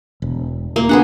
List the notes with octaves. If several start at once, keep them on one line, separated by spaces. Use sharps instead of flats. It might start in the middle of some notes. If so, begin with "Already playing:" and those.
E1
A#3
B3 D4 G#4 F#5